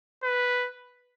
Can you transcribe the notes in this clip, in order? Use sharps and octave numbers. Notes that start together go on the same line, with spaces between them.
B4